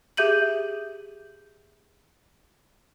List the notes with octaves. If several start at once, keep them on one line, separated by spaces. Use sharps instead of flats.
G4 G#4 E5 G6 D#7 F#7